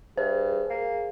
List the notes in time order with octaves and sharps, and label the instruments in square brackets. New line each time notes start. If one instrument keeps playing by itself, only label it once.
[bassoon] G2 [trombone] G#4 [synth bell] C5
[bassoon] A#3